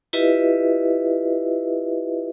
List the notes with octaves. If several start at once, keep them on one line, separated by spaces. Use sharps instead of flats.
E4 F4 G4 B4 D#5 E5